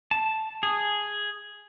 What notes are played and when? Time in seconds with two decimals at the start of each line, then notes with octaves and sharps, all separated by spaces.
0.11 A5
0.63 G#4